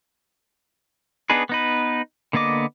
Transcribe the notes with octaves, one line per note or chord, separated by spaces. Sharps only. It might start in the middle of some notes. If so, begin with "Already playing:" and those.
B3 D4 D#4 G#4 B4
B3 D#4 B4
D3 A#3 B3 D#5 D6